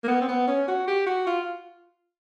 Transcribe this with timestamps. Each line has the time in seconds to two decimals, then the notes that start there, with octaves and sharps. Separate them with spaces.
0.04 A#3
0.08 B3
0.21 C4
0.28 B3
0.47 C#4
0.68 F#4
0.87 G4
1.06 F#4
1.27 F4